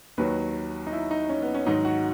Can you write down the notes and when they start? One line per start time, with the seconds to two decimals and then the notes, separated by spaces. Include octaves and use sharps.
0.18 D#2 D#3 F#3 B4
0.87 D#4
0.93 E4
1.11 D#4
1.29 C#4
1.42 B3
1.54 C#4
1.66 G#2 D#3 F#3 D#4
1.85 F#4